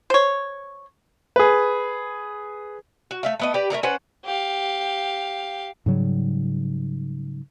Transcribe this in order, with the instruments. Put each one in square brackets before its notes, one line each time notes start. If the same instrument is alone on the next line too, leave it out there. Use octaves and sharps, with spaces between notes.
[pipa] C5 C#5
[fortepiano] G#4 B4
[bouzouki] F#4
A3 E5 F5
A3 B3 D#5
G4 B4 D5
A3 A#4 D5 A#5
C#4 B4 C5 F#5
[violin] G4 F5
[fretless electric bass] G#2 C#3 F#3 G3